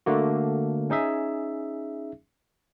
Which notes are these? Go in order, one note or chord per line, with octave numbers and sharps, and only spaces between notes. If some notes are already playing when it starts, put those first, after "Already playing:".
D3 A3 A#3 F#4
C#4 D#4 G#4 E5